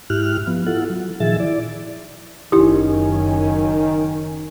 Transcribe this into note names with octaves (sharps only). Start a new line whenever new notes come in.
G#2 E4 G4 F6 F#6
F3 B3
E4 F4 A4 F#5
F#3
A#2 D#3 F3 G#4 E5 A6
E4 D5
F#1 F#2 D#3 C#4 E4 G4